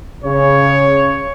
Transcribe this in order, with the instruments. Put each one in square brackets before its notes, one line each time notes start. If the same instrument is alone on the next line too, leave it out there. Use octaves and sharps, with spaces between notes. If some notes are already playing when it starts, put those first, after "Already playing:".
[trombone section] C#3 [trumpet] C#5